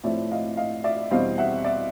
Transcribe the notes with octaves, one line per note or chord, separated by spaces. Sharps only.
A2 F3 A3 C4 D5 E5
D#5 F5
D#5 F5
D5 E5
E2 B2 G3 C4 D#5 F5
E5 F#5
D5 E5